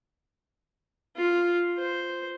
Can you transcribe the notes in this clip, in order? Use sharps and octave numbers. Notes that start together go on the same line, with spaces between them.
F4
C5